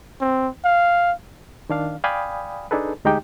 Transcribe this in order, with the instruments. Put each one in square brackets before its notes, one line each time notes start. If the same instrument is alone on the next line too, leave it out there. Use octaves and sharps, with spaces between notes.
[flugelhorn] C4
F5
[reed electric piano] D#3 D4 F5
D5 F5 G5 G#5 B5 D#6
D4 D#4 G#4 A4 B4
D2 G#3 D#4 G4 G5